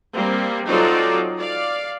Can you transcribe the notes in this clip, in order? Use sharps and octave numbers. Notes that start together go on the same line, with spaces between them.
G3 A#3 C4
F#3 C4 D#4 F4 A4 D5
D5 F5